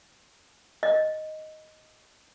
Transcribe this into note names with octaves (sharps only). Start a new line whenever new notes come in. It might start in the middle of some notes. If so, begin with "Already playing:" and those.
D#5